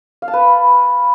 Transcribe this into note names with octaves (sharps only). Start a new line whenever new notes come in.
F5
A5
B4
B5